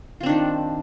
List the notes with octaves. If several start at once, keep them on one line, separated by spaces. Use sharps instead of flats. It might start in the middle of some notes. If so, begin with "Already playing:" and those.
D#3 C4 D4 F4